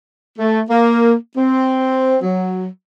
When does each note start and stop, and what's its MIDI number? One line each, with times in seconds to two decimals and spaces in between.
0.39 0.60 57
0.69 1.13 58
1.36 2.16 60
2.21 2.66 54